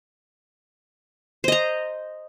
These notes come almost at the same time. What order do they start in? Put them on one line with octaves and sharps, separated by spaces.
C5 D#5 A#5